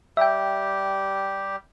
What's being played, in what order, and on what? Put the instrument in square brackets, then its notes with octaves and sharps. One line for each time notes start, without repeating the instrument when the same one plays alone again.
[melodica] G3 G4 [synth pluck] E5 G5